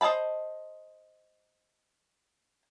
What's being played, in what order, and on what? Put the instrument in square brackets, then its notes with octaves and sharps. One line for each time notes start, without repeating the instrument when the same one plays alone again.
[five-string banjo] C5 D#5 F5 A5 B5